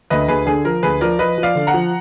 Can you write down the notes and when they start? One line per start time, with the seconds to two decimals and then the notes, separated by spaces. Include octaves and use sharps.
0.10 D2 B4 D#5
0.28 D2 G#4 B4
0.46 D3 G#4
0.65 F3 A#4
0.83 D2 G#4 B4
1.01 F3 A#4 D5
1.19 F3 B4 D#5
1.38 F3
1.43 D5 F5
1.55 D3
1.67 F#5 A#5
1.74 F3